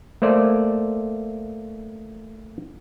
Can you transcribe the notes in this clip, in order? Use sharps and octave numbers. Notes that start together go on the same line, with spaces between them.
A3 A#3 C5 D5